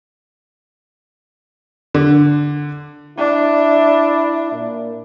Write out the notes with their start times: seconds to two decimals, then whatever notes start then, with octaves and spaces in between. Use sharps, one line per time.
1.94 D3
3.17 D4 E4
4.52 A#2